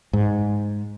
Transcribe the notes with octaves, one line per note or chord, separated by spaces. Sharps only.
G#2